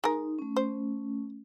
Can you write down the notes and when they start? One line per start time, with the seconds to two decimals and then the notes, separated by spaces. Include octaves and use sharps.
0.04 G#3 D#4 A#4
0.39 A3 C#4
0.56 C5